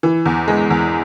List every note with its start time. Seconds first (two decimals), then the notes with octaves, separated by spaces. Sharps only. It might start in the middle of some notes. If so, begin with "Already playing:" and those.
0.03 E3
0.26 E2
0.48 G#3
0.70 E2